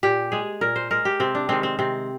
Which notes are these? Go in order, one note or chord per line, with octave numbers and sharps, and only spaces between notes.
A#2 G4
G#3 G#4
A#2 A#4
C5
G#3 A#4
G4
C3 C4
D4
D#3 G#3 C4
C4
C3 C4